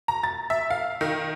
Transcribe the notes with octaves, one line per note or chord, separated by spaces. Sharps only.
A#5
A6
E5
F5
D#3